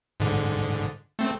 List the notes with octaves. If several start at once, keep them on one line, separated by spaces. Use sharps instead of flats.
G#2 D3
A3 C4